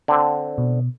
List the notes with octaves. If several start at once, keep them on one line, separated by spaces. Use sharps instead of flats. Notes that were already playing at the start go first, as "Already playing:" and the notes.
D3 C4
B2